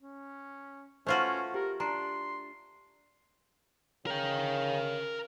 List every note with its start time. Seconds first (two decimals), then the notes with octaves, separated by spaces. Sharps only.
0.02 C#4
1.07 A3 C#4 F4 F#4 B4 C5 F5
1.54 G4 A#4
1.80 D4 A#5 C6
4.07 C#3 A#4 G5